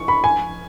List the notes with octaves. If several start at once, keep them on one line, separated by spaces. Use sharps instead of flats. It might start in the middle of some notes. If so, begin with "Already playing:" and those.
Already playing: C#6
B5
G#5